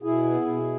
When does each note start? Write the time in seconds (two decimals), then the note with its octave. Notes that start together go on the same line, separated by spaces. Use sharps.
0.02 B2 E4 G#4
0.24 B3
0.47 B2